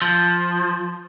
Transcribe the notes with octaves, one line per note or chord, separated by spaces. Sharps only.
F3